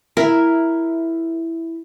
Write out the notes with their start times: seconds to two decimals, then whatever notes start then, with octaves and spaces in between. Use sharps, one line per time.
0.17 E4 A#4 E5